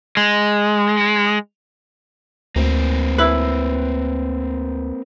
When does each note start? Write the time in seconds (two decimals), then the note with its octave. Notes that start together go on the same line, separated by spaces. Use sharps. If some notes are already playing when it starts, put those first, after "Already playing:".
0.17 G#3
2.56 D2 A#3 C4
3.18 E4 B4